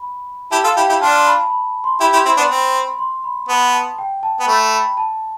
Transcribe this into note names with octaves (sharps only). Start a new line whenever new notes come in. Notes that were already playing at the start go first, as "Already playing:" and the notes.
Already playing: B5
E4 G4 A5
F4 A4 F5
E4 G4 G5
E4 G4 G5
D4 F4 A5
B5
B5
C6
E4 G4 B5
E4 G4 C6
C4 E4 B5
B3 D4
C6
C4
B5
C6
B5
B3 A5
A5
G5
A5
B3
A3 B5
B5
A5